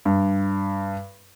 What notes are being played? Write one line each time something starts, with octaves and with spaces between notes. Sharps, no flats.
G2